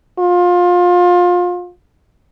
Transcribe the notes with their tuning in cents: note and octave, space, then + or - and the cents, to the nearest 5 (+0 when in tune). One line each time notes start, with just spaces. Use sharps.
F4 +25